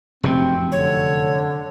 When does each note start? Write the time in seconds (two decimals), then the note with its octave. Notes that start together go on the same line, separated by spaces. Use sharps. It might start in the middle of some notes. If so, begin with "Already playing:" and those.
0.23 F1 F#2 C3 C4
0.72 D3 C#5